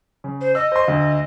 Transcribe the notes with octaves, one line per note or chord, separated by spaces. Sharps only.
C#3
C5
D#5 E6
C5 C6
D2 D3